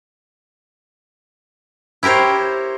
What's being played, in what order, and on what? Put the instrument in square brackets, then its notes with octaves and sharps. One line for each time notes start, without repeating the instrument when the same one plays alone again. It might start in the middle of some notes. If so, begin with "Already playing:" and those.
[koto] E4 G4 A#4 C5 C#5